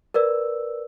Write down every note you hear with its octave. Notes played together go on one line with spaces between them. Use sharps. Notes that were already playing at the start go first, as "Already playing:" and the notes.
A#4 B4 D5 E6